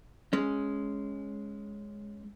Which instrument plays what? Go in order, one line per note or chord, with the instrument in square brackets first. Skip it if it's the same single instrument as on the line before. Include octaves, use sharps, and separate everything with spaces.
[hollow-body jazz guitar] G#3 C#4